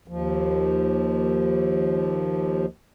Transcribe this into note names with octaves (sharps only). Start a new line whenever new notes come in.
D#2 F3